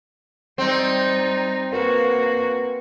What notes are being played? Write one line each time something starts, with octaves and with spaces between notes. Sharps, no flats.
G3 C4 D#4
A#3 F#4 A#4 B4